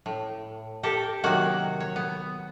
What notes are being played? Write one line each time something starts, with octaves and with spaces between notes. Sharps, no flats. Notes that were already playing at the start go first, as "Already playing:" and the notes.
A2
G4 A4 A#4
C3 D#3 F#3 A#3 F#4
C#5
B3